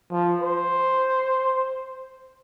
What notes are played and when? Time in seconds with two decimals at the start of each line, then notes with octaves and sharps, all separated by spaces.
0.11 F3
0.41 C5